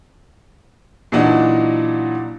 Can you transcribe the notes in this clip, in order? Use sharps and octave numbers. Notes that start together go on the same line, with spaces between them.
A#2 E3 F#3 D4 D#4 F#4